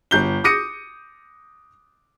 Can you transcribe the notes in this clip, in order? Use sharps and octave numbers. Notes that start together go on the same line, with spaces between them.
G1 G6 G7
D6 D#6 A#6 C#7 D#7